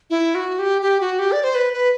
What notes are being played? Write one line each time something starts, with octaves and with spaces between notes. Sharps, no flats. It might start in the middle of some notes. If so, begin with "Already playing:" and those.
E4
F#4
G4
G4
F#4
G4
D5
C5
B4
B4